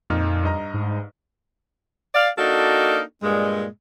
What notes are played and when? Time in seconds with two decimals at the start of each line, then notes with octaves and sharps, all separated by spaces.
0.10 F2 A#2 D#4 F6
0.43 G2 D#5 A#5
0.74 G#2
2.14 D5 F5
2.38 A#3 D4 D#4 F#4 A4
3.22 G2 A#2 G#3